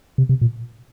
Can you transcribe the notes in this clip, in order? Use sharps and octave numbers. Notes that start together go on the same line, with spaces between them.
C3
C3
A#2